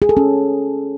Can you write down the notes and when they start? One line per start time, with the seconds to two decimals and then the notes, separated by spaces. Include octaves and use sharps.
0.02 G#4
0.09 A4
0.17 C#4